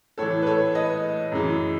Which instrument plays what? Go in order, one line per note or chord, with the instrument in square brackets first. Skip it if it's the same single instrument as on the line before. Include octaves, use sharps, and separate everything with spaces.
[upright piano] A2 E3 A4 C#5
B4
A4 C#5
B4 D#5
F#2 C#3 E3